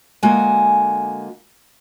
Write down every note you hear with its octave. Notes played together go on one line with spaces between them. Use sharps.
D3 G#3 A#3 F#4 G#5